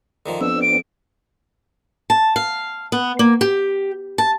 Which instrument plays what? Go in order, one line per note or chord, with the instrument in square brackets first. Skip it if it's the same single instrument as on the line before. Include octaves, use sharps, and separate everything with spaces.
[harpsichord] D3 D#3 F3
[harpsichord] F2 [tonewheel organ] B3 C4 D4 [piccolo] E6
[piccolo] D7
[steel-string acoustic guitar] A5
F5
B3
A#3
G4
A5